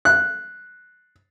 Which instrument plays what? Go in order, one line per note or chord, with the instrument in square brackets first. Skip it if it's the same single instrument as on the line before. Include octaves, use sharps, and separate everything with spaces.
[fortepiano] F#6